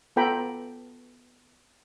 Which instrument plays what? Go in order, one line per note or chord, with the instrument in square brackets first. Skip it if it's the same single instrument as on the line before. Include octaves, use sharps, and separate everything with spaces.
[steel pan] B3 F4 A4 G5 A#5 B5